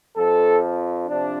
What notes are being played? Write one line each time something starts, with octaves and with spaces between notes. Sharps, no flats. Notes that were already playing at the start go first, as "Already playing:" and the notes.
F2 F3 A4
C3 F3 D4